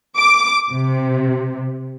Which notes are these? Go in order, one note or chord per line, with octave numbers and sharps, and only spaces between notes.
D6
C3